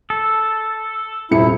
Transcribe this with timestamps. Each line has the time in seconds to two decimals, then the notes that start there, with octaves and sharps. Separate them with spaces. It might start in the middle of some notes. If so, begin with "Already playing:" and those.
0.10 A4
1.31 D#1 C3 E4 C#7